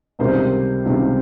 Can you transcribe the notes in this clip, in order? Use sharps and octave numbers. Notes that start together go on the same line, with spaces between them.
C#2 C3 D#3 G3 A#4 C5
C#2 C3 D#3 G3